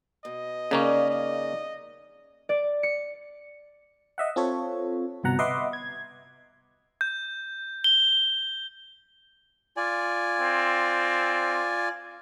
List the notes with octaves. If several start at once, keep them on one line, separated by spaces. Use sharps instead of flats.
B2 D#5
C#3 A#3 C#4 D#4 D5
D#5
D5
C#7
D#5 E5 F#5
C4 F4 A4 C#5
G1 C2 B2 F#5 A#5
B4 D#5 E5 F#5 C6 D6
G#6
G6
G7
F4 D5 G#5
C4